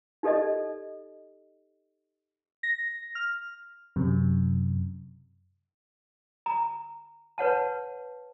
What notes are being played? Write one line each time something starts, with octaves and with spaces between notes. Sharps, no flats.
D#4 G4 A4 D5 D#5
A#6
F6
F#2 C3
A#5
B4 C#5 F#5 A5